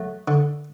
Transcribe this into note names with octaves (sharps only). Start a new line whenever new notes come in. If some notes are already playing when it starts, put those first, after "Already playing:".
Already playing: F#3 A3
D3